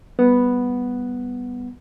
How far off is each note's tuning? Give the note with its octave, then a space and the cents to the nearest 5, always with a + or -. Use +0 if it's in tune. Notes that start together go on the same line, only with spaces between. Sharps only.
G3 +0 B3 +0 F#5 +0